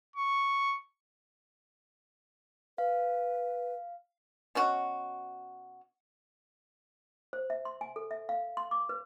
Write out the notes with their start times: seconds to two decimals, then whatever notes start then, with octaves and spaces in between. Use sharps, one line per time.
0.16 C#6
2.78 B4 F5
4.55 B2 C#4 F#4
7.33 C5
7.50 E5
7.65 C6
7.81 G#5
7.96 A4
8.11 E5
8.29 F5
8.57 C6
8.71 D6
8.89 B4